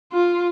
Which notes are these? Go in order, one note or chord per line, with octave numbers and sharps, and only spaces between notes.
F4